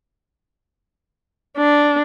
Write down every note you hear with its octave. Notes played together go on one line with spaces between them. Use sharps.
D4